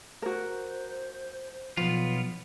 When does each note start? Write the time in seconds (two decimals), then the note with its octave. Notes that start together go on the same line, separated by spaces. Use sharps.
0.22 F#4 A#4 C5
1.77 B1 F3 B3 F4